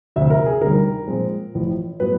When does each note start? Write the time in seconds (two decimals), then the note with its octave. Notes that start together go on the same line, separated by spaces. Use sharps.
0.16 D2 C3 F3 E5
0.30 A#4
0.46 G#4
0.61 D2 C3 D#3 G3 A#4
1.07 A#2 F3 G#3 C4
1.55 A1 A2 F3
2.00 A2 F#3 B3 B4